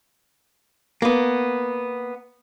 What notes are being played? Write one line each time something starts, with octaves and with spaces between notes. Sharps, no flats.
A#3 B3